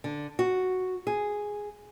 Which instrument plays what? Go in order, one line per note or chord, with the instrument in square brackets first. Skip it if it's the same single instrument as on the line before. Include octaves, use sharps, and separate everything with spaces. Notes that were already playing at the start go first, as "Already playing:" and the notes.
[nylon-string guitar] D3
F#4
G#4